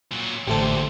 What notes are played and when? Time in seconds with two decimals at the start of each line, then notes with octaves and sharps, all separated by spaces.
0.12 A#2 F#3
0.47 A1 D2 A#2 D3 A3 G4 A4 C5